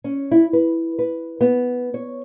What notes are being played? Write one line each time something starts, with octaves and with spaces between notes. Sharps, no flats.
C#4
E4
B4
B4
B3
C#5